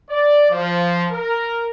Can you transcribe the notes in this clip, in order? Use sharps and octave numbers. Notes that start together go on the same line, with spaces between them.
D5
F3
A#4